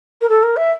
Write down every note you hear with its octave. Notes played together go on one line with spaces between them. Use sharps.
A#4
A4
A#4
E5